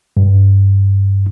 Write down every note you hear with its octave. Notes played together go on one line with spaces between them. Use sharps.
G2